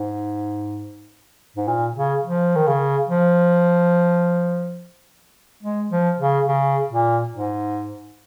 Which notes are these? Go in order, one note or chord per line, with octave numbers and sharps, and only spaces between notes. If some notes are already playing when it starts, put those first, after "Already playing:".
Already playing: G#2
G#2
A#2
C#3
F3
D#3
C#3
F3
G#3
F3
C#3
C#3
A#2
G#2